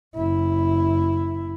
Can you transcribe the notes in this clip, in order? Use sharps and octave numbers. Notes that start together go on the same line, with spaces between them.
F#1 E4